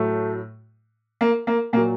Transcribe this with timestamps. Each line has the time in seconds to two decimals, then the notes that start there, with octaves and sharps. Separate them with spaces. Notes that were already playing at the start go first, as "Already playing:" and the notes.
Already playing: A2 F#3 A3
1.21 A#3
1.47 A#3
1.73 A#2 A#3
1.77 F#3